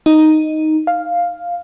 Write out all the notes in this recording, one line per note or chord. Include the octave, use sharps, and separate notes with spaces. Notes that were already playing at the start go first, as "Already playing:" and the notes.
D#4
F5